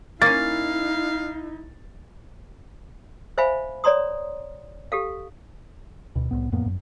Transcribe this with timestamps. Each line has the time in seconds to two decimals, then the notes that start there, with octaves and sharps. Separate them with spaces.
0.22 A#3 C#4 D#4 E4 F5 A6
3.38 C5 E5 F5 G#5 B5
3.84 C#5 D5 A#5 C6 D#6
4.92 G4 A4 F5
6.15 D2 B2
6.31 C2 A2 B3
6.52 F2 A2 A#3 B3
6.66 F#2